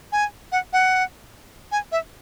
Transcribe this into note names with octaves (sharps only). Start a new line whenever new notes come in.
G#5
F#5
F#5
G#5
E5